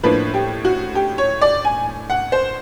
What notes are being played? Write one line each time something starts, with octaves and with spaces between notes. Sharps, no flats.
A2 F3 A#3 D4 B4
G4
F#4
G4
C#5
D5
G#5
F#5
C5